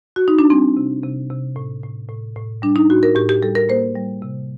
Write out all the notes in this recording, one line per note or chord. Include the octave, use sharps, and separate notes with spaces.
F#4
D#4
D4
G3 C4
C3
C3
C3
A2
A2
A2
A2
G3 D4
D#4
A2 F#4
A#4
A2 G4
G4
G3 A4
A#4
A#3 C5
G3
C3